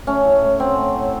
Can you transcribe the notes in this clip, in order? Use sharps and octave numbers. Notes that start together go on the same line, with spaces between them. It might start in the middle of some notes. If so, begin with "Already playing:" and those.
A3 C#4
A2
A2
F#3 C4
A3
A2